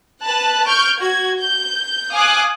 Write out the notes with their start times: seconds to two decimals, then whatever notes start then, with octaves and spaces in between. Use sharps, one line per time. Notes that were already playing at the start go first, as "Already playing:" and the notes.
0.23 B4 A5 F#6
0.67 C#6 F6 G6 D7
0.99 F#4 G#6
1.39 G6
2.13 F5 G#5 D6 D#6 F#6